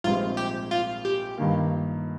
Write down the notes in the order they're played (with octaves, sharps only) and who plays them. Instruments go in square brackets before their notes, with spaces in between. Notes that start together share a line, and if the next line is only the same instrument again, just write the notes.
[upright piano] A#1 G#2 G3 C4 [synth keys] F4
[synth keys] G4
F4
G4
[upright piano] G2 D#3 A#3